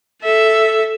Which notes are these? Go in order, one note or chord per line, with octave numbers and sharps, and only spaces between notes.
A4 E5